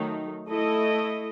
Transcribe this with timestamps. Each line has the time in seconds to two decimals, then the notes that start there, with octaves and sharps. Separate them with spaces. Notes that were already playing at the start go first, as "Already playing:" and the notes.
Already playing: D#3 F#3 A3 D#4
0.48 A3 E4 A4 D#5